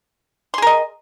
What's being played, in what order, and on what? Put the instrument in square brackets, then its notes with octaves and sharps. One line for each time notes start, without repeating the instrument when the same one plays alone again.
[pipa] C6
G#4
A#4
D#5